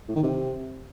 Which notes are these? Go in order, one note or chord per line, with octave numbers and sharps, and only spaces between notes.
A2
D#3
C3